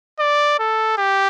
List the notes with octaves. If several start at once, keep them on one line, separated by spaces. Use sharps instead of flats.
D5
A4
G4